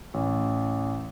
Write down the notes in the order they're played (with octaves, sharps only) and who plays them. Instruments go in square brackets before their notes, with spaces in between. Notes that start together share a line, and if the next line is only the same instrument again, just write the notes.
[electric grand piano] A1